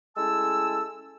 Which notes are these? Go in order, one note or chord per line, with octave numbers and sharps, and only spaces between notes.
G#3 A3 C#4 E4 A5 E6